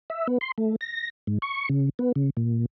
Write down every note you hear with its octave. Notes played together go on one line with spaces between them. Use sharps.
E5
B3
C6
A3
A#6
G#2
C#6
C#3
B3
C#3
A#2